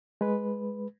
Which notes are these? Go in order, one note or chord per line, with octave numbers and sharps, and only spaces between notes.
G#3 B4